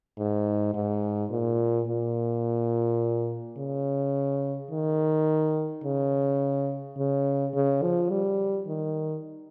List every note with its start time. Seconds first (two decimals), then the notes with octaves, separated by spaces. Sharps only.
0.18 G#2
0.74 G#2
1.31 A#2
1.87 A#2
3.57 C#3
4.71 D#3
5.84 C#3
6.97 C#3
7.54 C#3
7.83 F3
8.10 G3
8.67 D#3